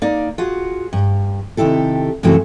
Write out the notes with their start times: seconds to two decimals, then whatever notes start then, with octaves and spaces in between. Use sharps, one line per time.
0.02 A#3 D#4 D5
0.38 F4 F#4 G#4 F#5
0.93 G2
1.57 C3 D#3 E4 G4 A4
2.23 F#2 C3 E3 A3 C4 F#4